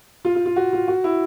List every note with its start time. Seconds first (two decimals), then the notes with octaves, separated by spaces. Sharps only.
0.25 F4
0.35 F4
0.46 F4
0.56 F#4
0.73 F4
0.88 F#4
1.04 E4